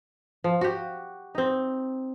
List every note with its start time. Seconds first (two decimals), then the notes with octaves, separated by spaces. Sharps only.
0.44 F3
0.61 F#4 G4
1.35 C4 D#4